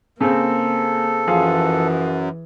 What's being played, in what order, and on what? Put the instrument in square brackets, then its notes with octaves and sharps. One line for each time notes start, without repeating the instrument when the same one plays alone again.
[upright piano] C#3 C4 [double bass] A#3 [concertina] A4
[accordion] F#2 [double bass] E3 [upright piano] F3 G#4 F5